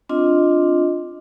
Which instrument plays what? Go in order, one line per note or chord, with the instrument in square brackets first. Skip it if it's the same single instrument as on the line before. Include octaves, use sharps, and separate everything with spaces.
[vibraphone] C4 D4 F4 D#5